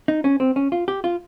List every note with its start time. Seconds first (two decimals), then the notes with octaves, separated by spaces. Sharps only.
0.08 D#4
0.24 C#4
0.40 C4
0.56 C#4
0.72 F4
0.88 G4
1.04 F4